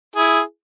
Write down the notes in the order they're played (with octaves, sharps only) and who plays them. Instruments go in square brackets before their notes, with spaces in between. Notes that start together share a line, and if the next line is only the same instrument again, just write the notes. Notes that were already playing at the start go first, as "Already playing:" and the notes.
[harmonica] E4 G#4